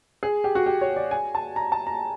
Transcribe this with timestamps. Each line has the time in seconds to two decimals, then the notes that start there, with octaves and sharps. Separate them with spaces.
0.23 G#4
0.44 G4
0.55 F#4
0.66 G4
0.81 C#5
0.96 D5
1.11 G#5
1.35 A5
1.56 A#5
1.72 A5
1.87 A#5